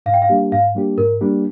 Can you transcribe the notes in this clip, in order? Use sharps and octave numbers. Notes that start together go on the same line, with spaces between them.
G#2 F5
G5
F5
G3 A#3 D4 G4
G#2 F5
G3 A#3 D4 G4
G#2 A#4
G3 A#3 D4 G4